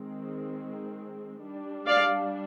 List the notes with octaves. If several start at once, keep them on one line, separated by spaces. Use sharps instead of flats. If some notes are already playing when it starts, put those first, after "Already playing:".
Already playing: D#3 G#3 C4
G3 D4
D5 F5